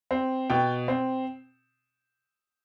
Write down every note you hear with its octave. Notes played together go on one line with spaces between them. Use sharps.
C4
B2 G5
C4